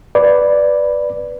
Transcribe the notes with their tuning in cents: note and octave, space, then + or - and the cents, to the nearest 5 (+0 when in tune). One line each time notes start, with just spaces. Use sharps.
B4 +0 D5 +0